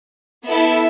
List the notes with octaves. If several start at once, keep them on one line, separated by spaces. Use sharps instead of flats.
B3 E4 A4 E5